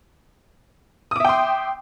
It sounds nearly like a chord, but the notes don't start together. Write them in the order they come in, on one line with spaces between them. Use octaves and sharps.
D#6 D6 E5 G5 C6